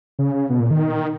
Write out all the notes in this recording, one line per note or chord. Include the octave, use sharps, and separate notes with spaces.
C#3
B2
A#2
D#3